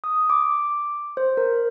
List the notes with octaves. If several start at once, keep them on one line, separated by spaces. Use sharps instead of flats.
D#6
D6
C5
A#4